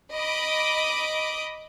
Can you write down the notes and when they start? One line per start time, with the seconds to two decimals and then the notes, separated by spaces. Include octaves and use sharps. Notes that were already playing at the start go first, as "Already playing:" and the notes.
0.14 D#5 B5 D6 D7